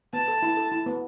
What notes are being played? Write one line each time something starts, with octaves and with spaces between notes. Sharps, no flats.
B3 A5
A4
E4
A4
E4
B3